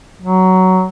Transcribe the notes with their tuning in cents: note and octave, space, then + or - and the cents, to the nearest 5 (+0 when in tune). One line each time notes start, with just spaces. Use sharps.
F#3 +10